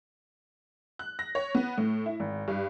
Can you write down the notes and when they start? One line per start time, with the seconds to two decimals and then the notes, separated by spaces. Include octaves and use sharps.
0.99 F#6
1.19 A#6
1.35 C#5
1.55 B3
1.78 A2
2.06 E4
2.20 G#1
2.48 G2